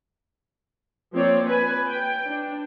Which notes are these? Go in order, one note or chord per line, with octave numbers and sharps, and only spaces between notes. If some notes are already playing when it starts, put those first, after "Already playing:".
F3 A#3 C4 C#5 D5
B4 G#5
G5
D4